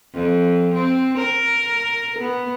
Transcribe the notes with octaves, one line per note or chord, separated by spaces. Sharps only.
F2
C4
A#4
B3